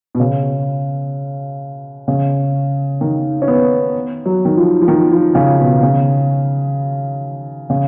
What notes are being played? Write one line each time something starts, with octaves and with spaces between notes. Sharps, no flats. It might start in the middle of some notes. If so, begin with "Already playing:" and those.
B2
C#3
C#3
D#3
C#4
B3
F#3
D#3
F3
F3
D#3
F3
C#3
B2
C#3
C#3